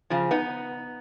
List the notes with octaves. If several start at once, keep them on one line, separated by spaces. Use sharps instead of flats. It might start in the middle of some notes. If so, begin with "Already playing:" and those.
C#3 F3
B3 D#4